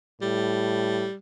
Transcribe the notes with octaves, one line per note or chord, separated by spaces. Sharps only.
A2 G3